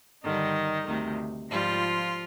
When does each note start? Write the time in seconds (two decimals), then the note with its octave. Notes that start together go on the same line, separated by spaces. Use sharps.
0.24 G2 D3 D#3 G3 D#4
0.88 D2 C3 D#3
1.50 G#2 F3 G3 F4